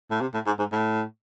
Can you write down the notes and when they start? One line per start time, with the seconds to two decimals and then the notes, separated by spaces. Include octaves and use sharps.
0.11 A2
0.21 C3
0.34 A2
0.46 G#2
0.59 G#2
0.72 A2